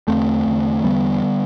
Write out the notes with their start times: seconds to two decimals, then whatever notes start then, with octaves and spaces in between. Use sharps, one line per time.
0.08 E2 D3 A3 C4
0.47 E2 D3
0.84 E2 D3 G3 B3
1.23 D3